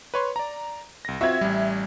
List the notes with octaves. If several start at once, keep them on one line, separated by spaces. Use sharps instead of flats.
B4 C#5 C6
D5 A#5
C2 A#6
C4 F4 F#4 E5 G#6
A1 G3